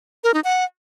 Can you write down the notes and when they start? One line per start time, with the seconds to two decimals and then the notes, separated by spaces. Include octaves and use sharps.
0.24 A#4
0.34 D#4
0.44 F#5